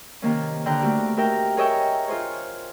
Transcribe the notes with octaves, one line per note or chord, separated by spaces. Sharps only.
C3 D#3 A#3 C#4
D3 G5 A#5 D6 F#6
A3 C4 F#4 G4 A#4
D#4 F#4 G4 A#4 E5 G5
G#4 A#4 C#5 D#5 E5 G5
F4 G#4 C5 C#5